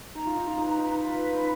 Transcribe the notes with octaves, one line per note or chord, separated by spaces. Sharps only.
D#4 A#5
F4
D#4
F4
D#4 B4
F4
D#4
F4 B4
D#4